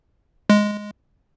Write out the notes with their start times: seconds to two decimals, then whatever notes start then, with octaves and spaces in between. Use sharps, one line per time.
0.50 G#3